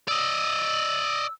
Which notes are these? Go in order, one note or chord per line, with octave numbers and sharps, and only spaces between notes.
D5 D#5 E6